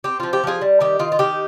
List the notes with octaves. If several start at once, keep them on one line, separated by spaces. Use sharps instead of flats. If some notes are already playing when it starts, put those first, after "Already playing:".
C4 G4
F3 F4
G4
F3 F4 G#4
G3
D#3 G4
D#3 F4
F4
D#3 G4